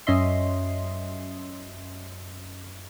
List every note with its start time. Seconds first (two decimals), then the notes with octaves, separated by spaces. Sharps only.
0.07 F#2 C#4 D#5 E5 C6